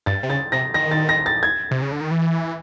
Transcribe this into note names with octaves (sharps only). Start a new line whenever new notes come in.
G2 A6
C3
C#3 A6
C3 A#6
D#3 A#6
A6
A#6
A6
G#6
C3
C#3
D3
D#3
E3